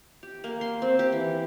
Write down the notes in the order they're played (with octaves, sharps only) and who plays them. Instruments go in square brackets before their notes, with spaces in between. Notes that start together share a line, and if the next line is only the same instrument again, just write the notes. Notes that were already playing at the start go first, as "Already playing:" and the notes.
[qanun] G4
A#3
C6
C4
G4
E3